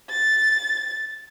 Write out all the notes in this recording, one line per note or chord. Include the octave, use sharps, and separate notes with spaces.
A6